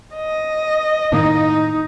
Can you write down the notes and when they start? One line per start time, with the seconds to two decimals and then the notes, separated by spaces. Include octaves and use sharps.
0.16 D#5
1.12 A2 D#3 A#3 D#4